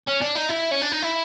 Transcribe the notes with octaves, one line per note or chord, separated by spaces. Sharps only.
C#4
D4
D#4
E4
C#4
D4
D#4
E4